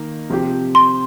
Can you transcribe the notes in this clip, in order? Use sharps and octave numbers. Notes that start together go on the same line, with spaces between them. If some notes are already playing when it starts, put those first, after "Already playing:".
Already playing: D#3 A#3 D#4
C3 F3 C4 G4
C6